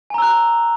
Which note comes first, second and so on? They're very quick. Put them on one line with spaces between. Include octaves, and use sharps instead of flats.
G#5 A#5 E6 F#6